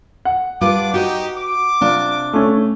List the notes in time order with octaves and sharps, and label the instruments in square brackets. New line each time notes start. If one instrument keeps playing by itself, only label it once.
[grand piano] F#5
[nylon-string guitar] G3 F4 B4 [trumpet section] D4 D6
[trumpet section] D#4 G4 [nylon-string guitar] F#4 D#5
[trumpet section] D6
[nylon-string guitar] C3 D4 F4
[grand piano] A3 C#4